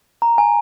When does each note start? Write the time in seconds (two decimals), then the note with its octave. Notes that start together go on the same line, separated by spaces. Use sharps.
0.22 A#5
0.38 G#5